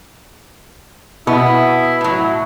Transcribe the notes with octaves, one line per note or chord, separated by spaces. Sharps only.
B2 B3 E4
A2 F#3